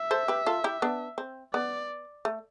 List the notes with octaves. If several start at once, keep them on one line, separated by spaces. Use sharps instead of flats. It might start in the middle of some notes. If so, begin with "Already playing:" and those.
Already playing: E5
A4 C5
G4 B4
F4 A4
E4 G4
B3 D4
C4
B3 D5
A3